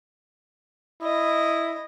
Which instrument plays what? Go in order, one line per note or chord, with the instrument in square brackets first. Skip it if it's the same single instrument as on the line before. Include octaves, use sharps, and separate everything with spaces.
[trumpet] E4 [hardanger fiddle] D#5